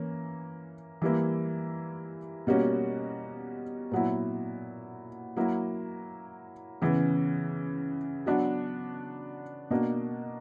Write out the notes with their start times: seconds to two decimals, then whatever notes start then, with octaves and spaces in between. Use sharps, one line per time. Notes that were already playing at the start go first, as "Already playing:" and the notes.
Already playing: E3 A#3 C#4
1.02 E3 G3 A#3 E4
2.47 B2 G3 A#3 C#4 F#4
3.91 A#2 F#3 B3 E4
5.36 F#3 A#3 E4
6.82 C#3 E3 B3
8.26 F#3 B3 D4 F#4
9.70 B2 A#3 D4 F#4